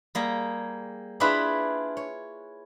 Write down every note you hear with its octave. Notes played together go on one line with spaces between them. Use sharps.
G3 A#3 G#4
D4 E4 F4 G#4 B4 E5
C#5